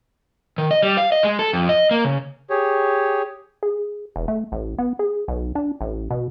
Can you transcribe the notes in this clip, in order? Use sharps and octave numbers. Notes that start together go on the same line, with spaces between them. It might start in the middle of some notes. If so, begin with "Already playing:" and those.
D#3
D#5
G3
F5
D#5
G#3
A4
F2
D#5
A#3
C#3
G4 G#4 C#5
G#4
E1
A3
A1
B3
G#4
B1
D4
A1
B2